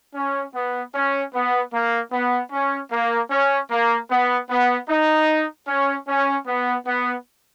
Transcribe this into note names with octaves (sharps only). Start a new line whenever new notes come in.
C#4
B3
C#4
B3
A#3
B3
C#4
A#3
C#4
A#3
B3
B3
D#4
C#4
C#4
B3
B3